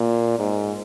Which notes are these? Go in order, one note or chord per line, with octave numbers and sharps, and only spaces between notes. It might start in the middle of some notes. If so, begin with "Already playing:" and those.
Already playing: A#2
G#2